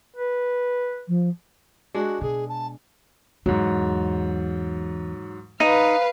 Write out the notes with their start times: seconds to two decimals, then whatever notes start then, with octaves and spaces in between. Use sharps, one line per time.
0.16 B4
1.08 F3
1.94 G#3 D4 F#4
2.21 B2 G#4
2.48 A5
3.46 E2 G#2 F#3
5.60 D#4 B4 F5